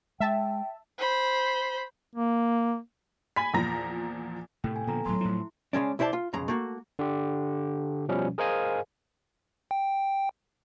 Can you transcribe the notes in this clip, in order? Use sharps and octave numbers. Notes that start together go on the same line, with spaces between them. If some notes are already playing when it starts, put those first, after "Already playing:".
G#3 E5 G5 A5
C5 B5
A#3
G#5 B5 B6
E2 A#2 F3 A#5 A#6
A2 C3 A4 G5
G#5
A#2 D3 F3 B3 A4 A#5
D#1 A2 F#3 A5 C6
A2 F3 E4
C#3 G#3 C#4 D4
C2 E4 C5 D5 A5
F4
B1 F2 C#3 G#3 A#5
A3 A#3 F#4
D3 G4
B2 F3 G3 C#4
G#4 A#4 C5 D#5 F5 G#5
G5